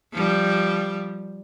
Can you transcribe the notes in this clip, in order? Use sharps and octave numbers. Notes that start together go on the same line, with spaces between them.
F3 G3